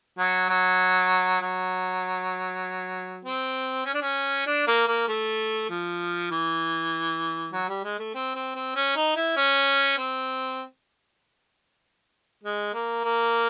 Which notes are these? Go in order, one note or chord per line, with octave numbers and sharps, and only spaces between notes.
F#3
F#3
F#3
C4
C#4
D4
C#4
D4
A#3
A#3
A3
F3
E3
F#3
G3
G#3
A3
C4
C4
C4
C#4
D#4
E4
C#4
C4
G#3
A#3
A#3